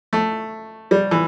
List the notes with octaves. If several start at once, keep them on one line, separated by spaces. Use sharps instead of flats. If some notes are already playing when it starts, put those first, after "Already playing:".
A3
G3
E3